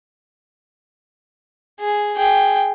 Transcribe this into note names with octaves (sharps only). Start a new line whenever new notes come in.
G#4
G#4 G5